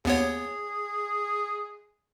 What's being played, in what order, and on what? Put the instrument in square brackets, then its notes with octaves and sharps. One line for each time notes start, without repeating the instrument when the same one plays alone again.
[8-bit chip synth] D#2 B3 C#5 [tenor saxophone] G#4